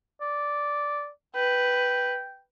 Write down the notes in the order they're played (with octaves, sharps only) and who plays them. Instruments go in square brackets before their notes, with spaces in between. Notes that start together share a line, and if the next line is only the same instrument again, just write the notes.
[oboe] D5
[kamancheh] B4 [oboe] G5